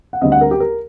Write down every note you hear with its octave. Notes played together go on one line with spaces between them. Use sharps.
F#5
D2 D3 G3 C4 D#5
F#5
A#4
G4
A#4